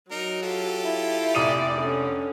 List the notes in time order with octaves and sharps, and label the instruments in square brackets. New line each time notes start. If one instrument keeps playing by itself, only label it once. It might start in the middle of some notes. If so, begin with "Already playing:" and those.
[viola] F#3 [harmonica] D#4 A#4
[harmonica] F4 G4 A4
[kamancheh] E4
[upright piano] F1 D#6 D#7 [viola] D5
[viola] D3 C#4